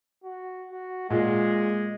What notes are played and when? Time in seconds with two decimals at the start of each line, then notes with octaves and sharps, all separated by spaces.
0.24 F#4
0.71 F#4
1.10 A#2 G#3